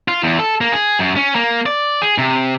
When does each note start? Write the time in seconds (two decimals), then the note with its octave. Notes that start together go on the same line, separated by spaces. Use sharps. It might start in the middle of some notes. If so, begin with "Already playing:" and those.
0.08 F4
0.23 E2
0.39 A4
0.61 A#3
0.72 G#4
0.99 F#2
1.16 C#4
1.35 A#3
1.66 D5
2.02 G#4
2.18 C3